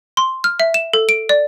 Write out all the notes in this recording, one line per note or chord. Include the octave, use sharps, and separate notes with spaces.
C6
F6
E5
E7
A4
D7
D5